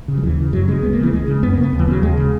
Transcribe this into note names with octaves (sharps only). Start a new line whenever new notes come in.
C#3
F#3
D#2 E3
C#3
F#2 F#3
C#3 G#3
C#2 B3
C#3 A#3
E3
C#2 G#3
C#3
F#2 B3
C#3 A#3
B3
D#2
E3
C#3 F#3
D#2 G#3
C#3